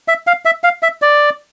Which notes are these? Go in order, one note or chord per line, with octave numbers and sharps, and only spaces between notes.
E5
F5
E5
F5
E5
D5